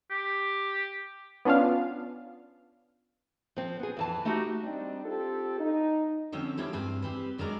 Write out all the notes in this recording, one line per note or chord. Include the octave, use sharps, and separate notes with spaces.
G4
B3 C#4 D4 F4 F5
F3 C4
B3 G#4
F2 E3 A5
A3 D#4 F#4 G4
G3 C4 D4 D#4
C4 F4 G4 A4
D#4
D3 F3 F#3 C4 C#4
F3 G3 A#3 E4 C#5 F5
G2 C4 F5 G#5
G3 C4 B4
F#2 F#3 G#3 A#4 D5 A#5